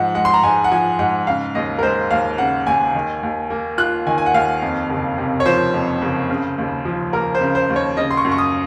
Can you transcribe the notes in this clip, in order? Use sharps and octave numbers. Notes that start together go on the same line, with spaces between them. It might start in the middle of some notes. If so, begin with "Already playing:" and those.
Already playing: G#2 F3 F#5
G#3 F#5
C6
A#5
G#2 G#5
F#5
F3 G#5
G#2 F#5
C#3 F5
D#2 D#5
A#4
G#3 C5
D#2 F5
C#3 F#5
D#2 G#5
D#3
D#2
A#3
F4 F#6
D#3 G#5
G#5
F#5
D#2 F5
F2
F#1
C3
C#5
F3 C5
F2
F#1
C#3
D#2
F3
A#3 A#4
C5
C#3
C5
D#2
C#5
C#3 D#5
C6
C#6
F#2
C#6
D#6